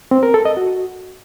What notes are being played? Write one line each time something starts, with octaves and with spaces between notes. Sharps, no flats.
C4
A#4
A4
D#5
F#4